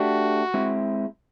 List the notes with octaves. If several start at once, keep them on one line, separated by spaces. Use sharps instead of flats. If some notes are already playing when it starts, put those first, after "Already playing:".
Already playing: A3 D4 F#4 G4
G#3 C4 E4